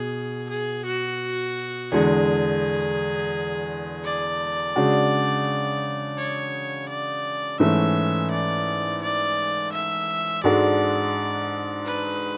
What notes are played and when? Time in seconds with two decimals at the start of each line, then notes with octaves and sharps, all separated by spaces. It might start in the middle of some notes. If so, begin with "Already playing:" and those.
Already playing: B2 G#4
0.50 G#4
0.86 F#4
1.91 E2 D3 G#3 G#4
4.05 D5
4.76 C#3 G#3 D4 F#4
6.18 C#5
6.89 D5
7.59 G#2 E3 A3 C#4 E5
8.31 D5
9.02 D5
9.72 E5
10.44 G#2 G#3 D4 F#4 A4 D5
11.86 B4